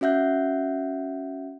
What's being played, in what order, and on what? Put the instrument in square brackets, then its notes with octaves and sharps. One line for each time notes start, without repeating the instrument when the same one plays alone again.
[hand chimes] C#4 F#4 E5 F#5 G6